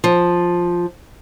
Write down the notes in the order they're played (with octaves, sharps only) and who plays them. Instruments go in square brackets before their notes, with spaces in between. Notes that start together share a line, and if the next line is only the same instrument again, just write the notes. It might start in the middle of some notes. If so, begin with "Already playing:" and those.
[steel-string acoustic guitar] F3